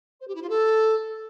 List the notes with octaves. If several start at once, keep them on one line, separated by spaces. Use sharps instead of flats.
C5
G4
E4
F4
A4